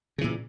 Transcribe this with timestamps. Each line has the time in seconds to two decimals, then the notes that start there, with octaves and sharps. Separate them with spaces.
0.18 C#3
0.21 E3
0.24 A#2